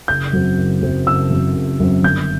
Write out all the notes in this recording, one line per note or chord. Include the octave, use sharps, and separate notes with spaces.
F#1 G6
F#2 F#3 C4
F#1
F#2 F#3 C4
F#1 E6
F#2 F#3 C4
F#1
F#2 F#3 C4
G1 G6